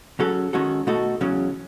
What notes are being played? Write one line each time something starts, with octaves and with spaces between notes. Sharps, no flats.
C#3 F#3 C#4 F#4 A4
D#3 G#3 C#4 F#4 A4
B2 A3 D#4 F#4 A4
E2 C#3 F#3 C#4